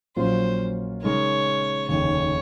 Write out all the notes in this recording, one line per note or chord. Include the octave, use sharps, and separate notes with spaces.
A#1 A#2 F#3 C#4 F4 C5
C#3 G#3 D#4 A#4 C#5
F1 D#2 C#3 C#5